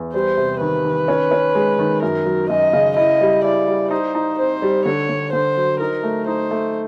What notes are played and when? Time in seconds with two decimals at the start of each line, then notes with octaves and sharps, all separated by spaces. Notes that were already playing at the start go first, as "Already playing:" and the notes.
Already playing: E2
0.14 G3 C5
0.37 C3
0.61 D#3 B4
0.85 D#3
1.08 C#4
1.31 C#4
1.55 G#3
1.79 D#3
2.02 F#2 A#4
2.26 F#3
2.49 F#2 D#5
2.73 C#3
2.97 E4 D#5
3.21 G3
3.44 E4 D5
3.68 G3
3.91 D#4 C5
4.15 D#4
4.39 C4 C5
4.62 G3
4.85 D3 C#5
5.09 D3
5.32 D3 C5
5.56 F#3
5.80 D#4 A#4
6.03 A3
6.27 D#4 C5
6.51 A3